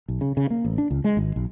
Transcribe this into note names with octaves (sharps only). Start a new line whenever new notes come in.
B1
C#3
C#3
A#3
A1
D4
C#2
G#3
G#1
B1